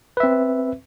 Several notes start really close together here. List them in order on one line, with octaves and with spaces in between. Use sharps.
B4 E5 C4